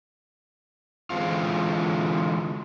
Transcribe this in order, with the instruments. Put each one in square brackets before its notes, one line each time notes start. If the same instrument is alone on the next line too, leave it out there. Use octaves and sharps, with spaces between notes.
[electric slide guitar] D3 E3 G#3 C4 F4